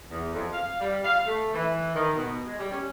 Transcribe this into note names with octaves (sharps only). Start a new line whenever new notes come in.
E2
F2
F5
G3
F5
A3
E3
D#3
B2
G#3
G3
C#4